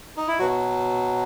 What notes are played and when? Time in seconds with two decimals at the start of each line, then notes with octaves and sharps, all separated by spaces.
0.17 D#4
0.28 E4
0.39 B2 F#3 F#4